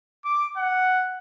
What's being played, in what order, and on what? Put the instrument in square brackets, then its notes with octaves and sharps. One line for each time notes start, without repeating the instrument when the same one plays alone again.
[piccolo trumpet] D6
F#5